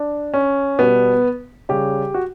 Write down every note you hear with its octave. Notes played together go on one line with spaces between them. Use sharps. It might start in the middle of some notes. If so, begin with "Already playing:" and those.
Already playing: D4
C#4
B2 G3 B3
C#3 G3 G4
F#4